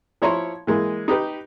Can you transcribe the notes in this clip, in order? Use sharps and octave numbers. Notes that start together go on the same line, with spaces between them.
F3 E4 C#5 A#5 C6
E3 G#3 A#3
D#4 G4 B4